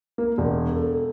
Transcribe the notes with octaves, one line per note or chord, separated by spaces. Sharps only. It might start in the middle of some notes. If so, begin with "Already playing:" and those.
A#3
E1
A4